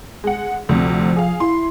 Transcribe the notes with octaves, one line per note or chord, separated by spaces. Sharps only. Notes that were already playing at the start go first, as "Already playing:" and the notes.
G#3 F#5
D2 C3 F3
G#4 F5
E4 C6